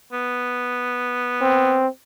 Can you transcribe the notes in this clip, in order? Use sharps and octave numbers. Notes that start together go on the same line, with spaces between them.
B3
C4